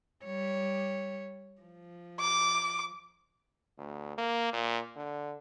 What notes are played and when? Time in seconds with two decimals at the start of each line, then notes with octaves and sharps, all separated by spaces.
0.24 G3 C#5
1.61 F3
2.20 D6
3.78 D2
4.18 A#3
4.53 A#2
4.96 D3